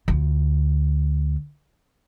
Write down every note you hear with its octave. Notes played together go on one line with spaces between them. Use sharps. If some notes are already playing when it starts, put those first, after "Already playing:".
D2 F4